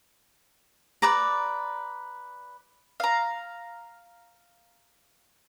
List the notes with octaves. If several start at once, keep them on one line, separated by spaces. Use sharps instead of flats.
B4 D5 A#5
F5 A#5